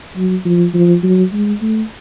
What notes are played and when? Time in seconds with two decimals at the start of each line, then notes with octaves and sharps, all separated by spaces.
0.16 F#3
0.45 F3
0.74 F3
1.03 F#3
1.33 G#3
1.62 A3